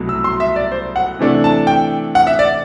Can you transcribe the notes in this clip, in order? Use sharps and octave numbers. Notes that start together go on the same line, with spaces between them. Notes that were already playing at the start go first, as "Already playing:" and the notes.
Already playing: C2 B2 F#3 A3
E6
C6
E5
D5
C5
F#5
C3 E3 A3 D4
A5
G5
F#5
E5
D5